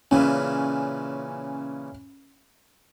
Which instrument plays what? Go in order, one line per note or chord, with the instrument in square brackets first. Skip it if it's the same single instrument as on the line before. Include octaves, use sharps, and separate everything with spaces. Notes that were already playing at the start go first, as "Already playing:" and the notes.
[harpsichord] A#2 C#3 E3 [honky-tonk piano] C#4